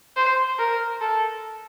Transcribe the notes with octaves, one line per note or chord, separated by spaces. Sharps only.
C5
A#4
A4